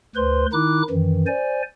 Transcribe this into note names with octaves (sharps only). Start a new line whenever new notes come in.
D2 B4 C5 C6
D#3 D#4 E4 D6 F#6
F#2 D#3 E3
C5 D5 G#5